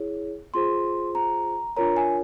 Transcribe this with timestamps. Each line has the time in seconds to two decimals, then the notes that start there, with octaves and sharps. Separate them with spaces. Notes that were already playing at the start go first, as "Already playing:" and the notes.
Already playing: E4 G#4 C#5
0.54 F4 G#4 C5 C6
1.15 A#5
1.76 D4 F4 A#4 C#5 A#5
1.97 G#5